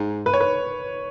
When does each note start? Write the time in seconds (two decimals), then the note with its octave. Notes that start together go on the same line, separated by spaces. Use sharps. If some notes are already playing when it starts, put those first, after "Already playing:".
Already playing: G#2
0.26 B4
0.33 C#5
0.41 B4